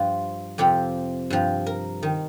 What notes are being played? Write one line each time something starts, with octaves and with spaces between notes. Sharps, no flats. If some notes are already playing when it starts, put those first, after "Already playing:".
Already playing: G2 F3 F4
F2 C3 F3 G4
G2 F3
A#4
D#3